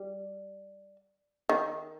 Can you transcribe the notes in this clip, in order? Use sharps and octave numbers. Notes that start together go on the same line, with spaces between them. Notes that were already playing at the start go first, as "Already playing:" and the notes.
Already playing: G3
D#3